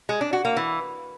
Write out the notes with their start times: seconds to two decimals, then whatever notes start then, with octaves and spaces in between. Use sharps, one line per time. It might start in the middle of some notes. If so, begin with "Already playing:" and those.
0.09 G#3
0.21 D4
0.33 F#4
0.45 A#3
0.57 E3